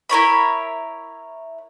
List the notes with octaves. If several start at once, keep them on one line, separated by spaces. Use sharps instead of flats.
E4 A#4 C#5 B5